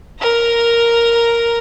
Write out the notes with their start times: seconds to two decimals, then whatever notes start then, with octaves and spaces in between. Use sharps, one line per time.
0.20 A#4 A#5